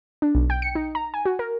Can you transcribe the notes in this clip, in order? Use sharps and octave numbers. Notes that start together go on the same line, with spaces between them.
D4
B1
G5
C#7
D#4
A#5
G#5
F#4
A#4